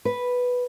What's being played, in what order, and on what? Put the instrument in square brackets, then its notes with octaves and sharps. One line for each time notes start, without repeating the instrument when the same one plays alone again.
[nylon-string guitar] B4